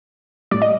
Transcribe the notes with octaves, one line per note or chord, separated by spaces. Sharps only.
A2 G3 D5
D#5